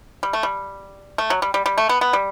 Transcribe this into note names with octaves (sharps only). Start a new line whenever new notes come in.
G3
A3
G3
A3
F#3
G3
G3
G3
A3
B3
B3
G3